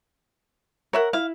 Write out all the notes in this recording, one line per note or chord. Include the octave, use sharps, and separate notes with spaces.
A#4 C#5 E5 F#5
E4 F5